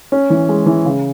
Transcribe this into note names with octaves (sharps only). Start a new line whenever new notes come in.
C#4
E3
G#3
E3
C#3